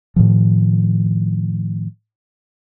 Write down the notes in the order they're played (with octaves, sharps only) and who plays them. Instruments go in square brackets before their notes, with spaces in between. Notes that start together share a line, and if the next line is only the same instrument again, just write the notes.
[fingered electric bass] A2 D#3 F3